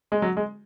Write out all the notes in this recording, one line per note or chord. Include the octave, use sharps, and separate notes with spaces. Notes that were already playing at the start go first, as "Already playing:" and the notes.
G#3
F#3
G#3